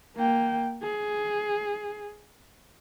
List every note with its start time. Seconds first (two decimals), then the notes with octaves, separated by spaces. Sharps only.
0.16 A#3 G5
0.82 G#4